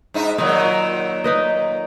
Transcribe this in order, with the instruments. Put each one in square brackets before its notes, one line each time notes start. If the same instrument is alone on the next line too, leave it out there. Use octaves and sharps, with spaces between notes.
[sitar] G#2 D#4 E5
[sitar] A#2 D#3 F#3 [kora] D#4
[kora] D#4 B4 D#5